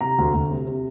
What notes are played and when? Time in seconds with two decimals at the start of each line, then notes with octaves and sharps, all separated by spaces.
0.01 C3 A#5
0.18 D2
0.34 D2
0.50 C3
0.67 C3